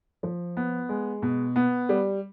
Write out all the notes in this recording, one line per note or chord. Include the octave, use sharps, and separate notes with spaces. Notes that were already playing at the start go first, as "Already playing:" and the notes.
F3
B3
G#3
B2
B3
G3